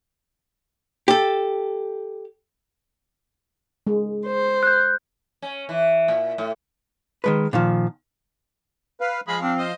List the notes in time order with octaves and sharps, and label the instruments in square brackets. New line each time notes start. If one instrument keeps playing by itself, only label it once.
[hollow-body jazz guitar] G4 A4
[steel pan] G#3
[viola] C5
[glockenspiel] F#6 G6
[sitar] C#4
E3
A#2
A2
[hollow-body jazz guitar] D#3 G#3 B4
A#2 D#3 F3
[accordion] B4 F5
[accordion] F3 F5 [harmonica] G#3 G#4 B5
[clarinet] C4 [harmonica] D4
[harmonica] C5 D#5